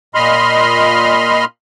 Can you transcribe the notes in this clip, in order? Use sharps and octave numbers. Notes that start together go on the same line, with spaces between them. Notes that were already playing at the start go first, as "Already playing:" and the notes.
A#2 D#5 B5 C6 F6